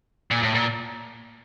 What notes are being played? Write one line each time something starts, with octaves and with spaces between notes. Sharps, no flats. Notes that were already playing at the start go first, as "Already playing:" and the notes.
A#2
A2
A#2